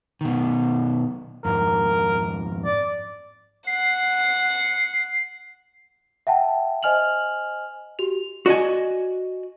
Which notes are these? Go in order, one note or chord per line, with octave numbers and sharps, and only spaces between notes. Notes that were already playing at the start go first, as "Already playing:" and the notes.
B2 D#3
F2 G#2 A#4
D5
F#5 C7
E5 F#5 G5 A5
C5 D#5 G#5 F6 F7 F#7
F#4 G4 F7
F#4 D5 D#5 G#5